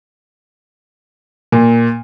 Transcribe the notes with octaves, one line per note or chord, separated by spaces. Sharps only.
A#2